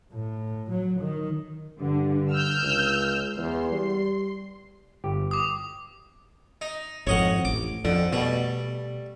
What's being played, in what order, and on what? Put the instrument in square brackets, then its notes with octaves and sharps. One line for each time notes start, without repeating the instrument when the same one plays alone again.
[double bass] A2
F#3
D#3
[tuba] G2 [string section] D3
[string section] E6 F6 G6
[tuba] C#2
[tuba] E2 [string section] C6
[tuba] G3
[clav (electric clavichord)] G1 G4
[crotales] D6 D#6
[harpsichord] D#4
[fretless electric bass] G#1 F2 [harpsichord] C#5 D#5 F#5
[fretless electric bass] A1 [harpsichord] D6
[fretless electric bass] F2 [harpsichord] D3
[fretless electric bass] B2 [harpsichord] G3 A3